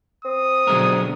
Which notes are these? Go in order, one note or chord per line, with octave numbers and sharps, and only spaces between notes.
C4 D#6
B2 D3 F#3 G#3 A#4